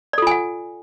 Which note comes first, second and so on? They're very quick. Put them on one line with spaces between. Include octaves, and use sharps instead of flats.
D5 A4 F4 G#5 F#5